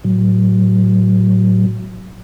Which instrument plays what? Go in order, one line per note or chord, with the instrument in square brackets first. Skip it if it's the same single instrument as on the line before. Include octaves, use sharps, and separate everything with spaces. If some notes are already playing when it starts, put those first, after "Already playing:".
[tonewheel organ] A2 F#3